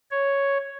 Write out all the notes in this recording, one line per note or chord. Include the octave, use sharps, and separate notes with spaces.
C#5